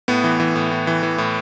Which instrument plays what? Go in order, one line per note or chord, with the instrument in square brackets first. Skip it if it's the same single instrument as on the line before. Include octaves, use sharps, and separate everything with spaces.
[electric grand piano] A2 B3
E3
E3
A2
A2
E3
E3
A2